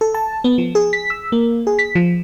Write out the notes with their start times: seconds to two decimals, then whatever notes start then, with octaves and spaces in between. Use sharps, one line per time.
0.01 A4
0.14 A5
0.44 B3
0.58 F3
0.75 G#4
0.93 B6
1.10 E6
1.32 A#3
1.67 G#4
1.79 B6
1.95 F3